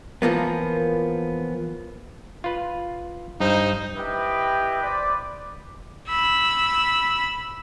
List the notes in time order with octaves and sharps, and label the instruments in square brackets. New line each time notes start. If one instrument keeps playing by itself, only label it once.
[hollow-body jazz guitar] E3 F3 A#3 B3
[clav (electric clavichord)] F4 B4
[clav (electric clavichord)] G2 [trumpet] D#4 [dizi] C5
[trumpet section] E4 G4 B4 D#5 G5
B4 C5 D5
[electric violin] B5 E6